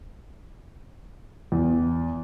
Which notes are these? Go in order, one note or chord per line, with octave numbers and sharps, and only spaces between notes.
E2